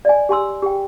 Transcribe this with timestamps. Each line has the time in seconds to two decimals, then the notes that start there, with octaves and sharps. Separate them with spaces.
0.05 D5 D#5 G#5
0.29 G4 G#5 C6 E6
0.62 G4 G5